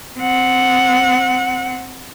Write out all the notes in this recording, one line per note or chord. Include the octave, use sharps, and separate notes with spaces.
C4 F#5